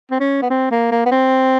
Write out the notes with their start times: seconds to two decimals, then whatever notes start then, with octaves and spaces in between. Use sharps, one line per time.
0.11 C4
0.20 C#4
0.42 B3
0.50 C4
0.71 A#3
0.91 A#3
1.06 B3
1.12 C4